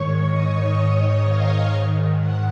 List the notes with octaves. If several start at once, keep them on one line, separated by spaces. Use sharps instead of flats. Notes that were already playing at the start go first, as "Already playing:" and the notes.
Already playing: G#2 D#3 C#5 C#6
D#5 D#6
F5 F6
G#2 D#3
F#5